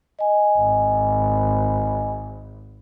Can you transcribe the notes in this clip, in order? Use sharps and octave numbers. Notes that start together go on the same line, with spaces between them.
D#5 G#5
G#1